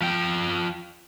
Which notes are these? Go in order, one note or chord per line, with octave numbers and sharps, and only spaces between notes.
F3 G5